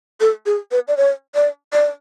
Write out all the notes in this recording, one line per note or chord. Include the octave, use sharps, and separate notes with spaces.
A4
G#4
B4
D5
C#5
D5
D5